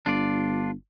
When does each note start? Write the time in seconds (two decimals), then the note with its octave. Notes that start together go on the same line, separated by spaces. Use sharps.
0.06 G1 D4 F4 D5